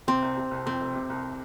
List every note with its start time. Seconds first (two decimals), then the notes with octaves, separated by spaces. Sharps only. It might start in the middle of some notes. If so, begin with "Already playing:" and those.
0.07 C3 C4
0.22 C2
0.37 C3
0.51 C2
0.66 F2 C4
0.81 F1
0.95 C3
1.10 C2